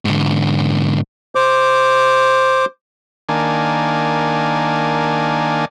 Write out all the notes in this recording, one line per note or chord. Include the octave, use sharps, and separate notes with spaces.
G#2 D3
C5 D6
D#3 A#3 D4 G#5